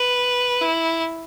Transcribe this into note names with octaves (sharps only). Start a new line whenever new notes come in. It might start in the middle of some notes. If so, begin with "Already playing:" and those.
Already playing: B4
E4